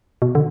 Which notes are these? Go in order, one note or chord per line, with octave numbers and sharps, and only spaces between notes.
B2
D3